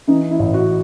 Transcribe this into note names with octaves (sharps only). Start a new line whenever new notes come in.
E3 D#4
E4
A1
F#4